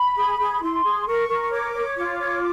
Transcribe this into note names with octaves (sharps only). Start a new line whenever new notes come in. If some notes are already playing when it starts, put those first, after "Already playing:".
Already playing: B5
G#4
G#4
E4 C6
G#4
A#4 C#6
A#4
C#5 D6
C#5
F4 D6
C#5